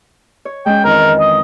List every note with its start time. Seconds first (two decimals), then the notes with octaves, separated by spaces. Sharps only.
0.45 C#5
0.66 G#3 C#4 G5
0.84 F2 D#3 E3 A#4
1.20 D#5